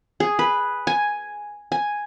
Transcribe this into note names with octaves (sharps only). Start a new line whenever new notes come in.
G#4
B4
G#5
G#5